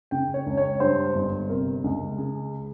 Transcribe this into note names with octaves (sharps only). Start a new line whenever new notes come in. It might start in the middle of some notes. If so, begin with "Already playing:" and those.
C#3 G5
C#5
C#2
C#5
G2 C5
G1
C3 A#4
C#2
C#3 G#4